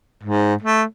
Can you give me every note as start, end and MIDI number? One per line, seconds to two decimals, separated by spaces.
0.23 0.55 44
0.63 0.83 57